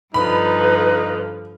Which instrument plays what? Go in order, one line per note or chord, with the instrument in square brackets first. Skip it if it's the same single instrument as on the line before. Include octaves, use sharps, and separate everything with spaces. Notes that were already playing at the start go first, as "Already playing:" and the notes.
[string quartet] G2 D3 F3 [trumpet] D#4 [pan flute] B4 [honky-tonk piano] B5